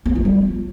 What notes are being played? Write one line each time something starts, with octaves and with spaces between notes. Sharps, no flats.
B3
F4
G3